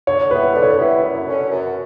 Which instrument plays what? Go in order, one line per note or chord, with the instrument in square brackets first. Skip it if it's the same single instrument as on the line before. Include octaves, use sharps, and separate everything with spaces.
[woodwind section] D3 [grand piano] C#5
[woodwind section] G3 B3 E4 [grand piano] B4
[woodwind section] D3 [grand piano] B4
[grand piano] C#5
B4
[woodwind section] G3 B3 E4
F#2
D3 F#3 C#4
F#2